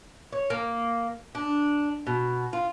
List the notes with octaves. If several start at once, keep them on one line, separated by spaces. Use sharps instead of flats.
C#5
A#3
D4
B2
F4